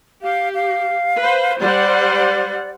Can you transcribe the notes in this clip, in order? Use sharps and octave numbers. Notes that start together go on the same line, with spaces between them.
G4 F5
F5
B4 C5
G3 C5 D5 F#5